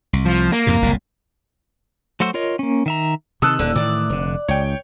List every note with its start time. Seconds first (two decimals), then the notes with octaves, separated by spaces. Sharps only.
0.13 C2
0.25 F3
0.52 A#3
0.67 F2 G#2 C3
0.82 F#1 C2 A#2
2.20 F#3 A3 F#4 C5 E6
2.34 F4 A#4 C#5 D#5
2.59 A#3 C#4
2.86 D#3 E5 A#5
3.42 C3 D#3 A4 D#6 E6 F#6
3.59 D#1 D#2 D3
3.76 A2 D#3 E3 D5
4.09 F1 D3
4.48 C#2 C#5 G5